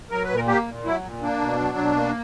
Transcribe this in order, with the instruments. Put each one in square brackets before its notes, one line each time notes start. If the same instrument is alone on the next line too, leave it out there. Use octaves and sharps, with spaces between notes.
[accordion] F#3 A#4
B4
A#2
A#4
A#3 G4
A#2
F#3 E4
A#2
A#3 D4
B2
F#3
B2
A#3